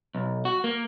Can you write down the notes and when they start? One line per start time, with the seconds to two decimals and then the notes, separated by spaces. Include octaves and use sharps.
0.15 B1
0.45 F#4
0.64 A#3